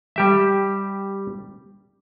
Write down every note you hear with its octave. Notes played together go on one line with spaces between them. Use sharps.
G3 G4 E5